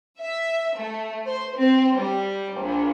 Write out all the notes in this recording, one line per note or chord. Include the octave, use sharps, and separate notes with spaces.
E5
A3
C5
C4
G3
A#1